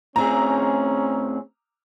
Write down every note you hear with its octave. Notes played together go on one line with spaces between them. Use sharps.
A2 C4 C#4 G#4 A#5